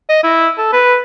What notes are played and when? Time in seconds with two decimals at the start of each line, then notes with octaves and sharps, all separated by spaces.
0.09 D#5
0.23 E4
0.58 A4
0.73 B4